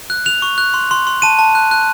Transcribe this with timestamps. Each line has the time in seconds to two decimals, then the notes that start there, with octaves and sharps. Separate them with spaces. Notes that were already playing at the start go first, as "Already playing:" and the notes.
0.10 F#6
0.25 F#6 F7
0.42 C#6
0.58 F#6
0.74 C6
0.91 C6
1.07 C6
1.22 A5 D#7
1.39 A5
1.55 F#6
1.71 F#6